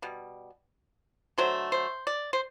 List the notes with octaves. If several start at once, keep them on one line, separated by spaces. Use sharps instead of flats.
B2 G3
D3 F#3 A3 C5
C5
D5
C5